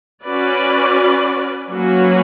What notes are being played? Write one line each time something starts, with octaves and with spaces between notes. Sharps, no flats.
C#4 F#4 B4 D5
F#3 A#3 C#4 F#4 B4